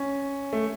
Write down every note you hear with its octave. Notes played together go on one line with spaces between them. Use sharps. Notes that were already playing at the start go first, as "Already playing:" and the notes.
Already playing: C#4
A3